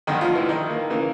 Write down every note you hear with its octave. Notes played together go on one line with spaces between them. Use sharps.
G2 D3 D#3 D#4
F3 F4
E3 E4
D#3 D#4
A#3
C#3 E3 A#3